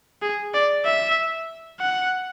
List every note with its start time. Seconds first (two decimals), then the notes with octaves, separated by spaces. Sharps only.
0.22 G#4
0.54 D5
0.85 E5
1.80 F#5